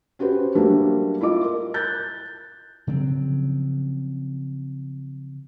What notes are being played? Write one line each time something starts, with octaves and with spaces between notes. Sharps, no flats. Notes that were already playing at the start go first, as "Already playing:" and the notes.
C#4 F#4 G4 B4 C5
F#3 G3 A3 A#3 D4
E4 F4 D#5 D6
A#4
F#6 G6 A6
C#3 F3 F#3 C4